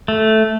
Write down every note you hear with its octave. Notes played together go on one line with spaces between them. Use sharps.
A3